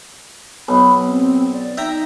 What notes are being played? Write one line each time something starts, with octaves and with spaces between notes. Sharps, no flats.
B1 B5
C4
D5
D#4 E5 G5 A#5